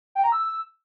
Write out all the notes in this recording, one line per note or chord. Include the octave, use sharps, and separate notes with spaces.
G5
A#5
E6